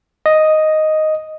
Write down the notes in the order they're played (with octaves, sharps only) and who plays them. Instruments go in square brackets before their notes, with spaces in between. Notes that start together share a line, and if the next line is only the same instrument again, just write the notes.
[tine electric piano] D#5